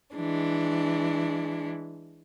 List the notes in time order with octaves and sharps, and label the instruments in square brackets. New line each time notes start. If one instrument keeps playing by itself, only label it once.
[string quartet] E3 G#3 D4